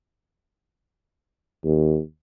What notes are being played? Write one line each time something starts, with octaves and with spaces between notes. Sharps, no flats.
D#2